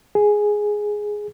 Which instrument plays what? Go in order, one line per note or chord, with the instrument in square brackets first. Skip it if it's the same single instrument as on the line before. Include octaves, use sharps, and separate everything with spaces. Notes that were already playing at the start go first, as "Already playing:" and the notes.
[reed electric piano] G#4